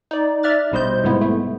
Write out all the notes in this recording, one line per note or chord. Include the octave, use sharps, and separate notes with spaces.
D#4 D5
D5 E5 F6 F#6 A6
A#1 B2 G3 C5 D#5 G6
G#2 C3 G3 G#3 B3 E4
A3